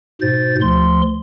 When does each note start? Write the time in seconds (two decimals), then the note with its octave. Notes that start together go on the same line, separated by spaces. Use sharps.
0.21 G#2 B2 C5 A6
0.62 D2 F3 C6